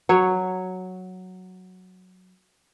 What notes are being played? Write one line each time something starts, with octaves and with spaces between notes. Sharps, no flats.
F#3 C#5